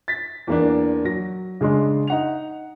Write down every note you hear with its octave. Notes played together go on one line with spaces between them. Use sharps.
A6 B6
E2 A#3 D4
F#3 A#6
C#3 G#3 D4 C6
D#4 F#5 F7